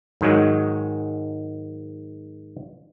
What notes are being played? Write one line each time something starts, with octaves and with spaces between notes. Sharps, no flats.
G#2 D#3 F#3 G#3